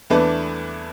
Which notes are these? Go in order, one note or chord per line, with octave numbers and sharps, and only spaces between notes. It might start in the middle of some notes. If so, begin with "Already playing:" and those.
E2 E3 A3 D4 B4